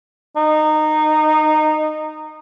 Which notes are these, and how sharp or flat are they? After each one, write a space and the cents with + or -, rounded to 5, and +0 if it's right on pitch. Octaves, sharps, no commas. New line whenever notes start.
D#4 -15